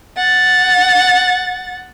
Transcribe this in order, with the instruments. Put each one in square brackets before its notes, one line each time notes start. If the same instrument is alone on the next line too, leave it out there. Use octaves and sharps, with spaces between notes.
[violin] F#5 A6